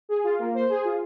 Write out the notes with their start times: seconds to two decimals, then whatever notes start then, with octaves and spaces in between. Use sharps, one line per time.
0.09 G#4
0.24 F4
0.39 A#3
0.54 C5
0.69 G#4
0.85 F4